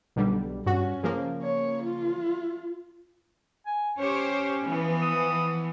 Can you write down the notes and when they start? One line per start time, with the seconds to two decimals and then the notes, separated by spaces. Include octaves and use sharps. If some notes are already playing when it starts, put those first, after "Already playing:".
0.16 B1 D3 G3
0.66 G2 C#4 F#4
1.03 C#3 F3 A#3
1.42 C#5
1.83 F4
3.66 G#5
3.98 C#4 G4 C5 C#5
4.65 E3 F3 B3
5.02 D#6